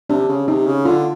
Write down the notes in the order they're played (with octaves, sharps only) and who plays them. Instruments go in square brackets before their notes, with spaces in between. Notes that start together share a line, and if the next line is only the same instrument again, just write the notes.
[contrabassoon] C3 [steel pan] D4
[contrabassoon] C#3
[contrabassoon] C3 [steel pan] D#4
[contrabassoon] C#3
[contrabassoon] D3 [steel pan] F4